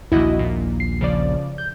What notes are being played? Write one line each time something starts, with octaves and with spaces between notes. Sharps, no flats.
A#1 D#2 E4 F#4 D#5
A#2
C7
C#3 F3 D5
G6